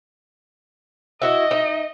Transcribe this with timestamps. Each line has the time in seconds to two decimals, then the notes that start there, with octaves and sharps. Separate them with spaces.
1.22 E4 F#4 D#5 E5
1.51 D#4 E5